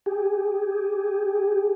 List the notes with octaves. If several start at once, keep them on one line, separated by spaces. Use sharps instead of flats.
G4 G#4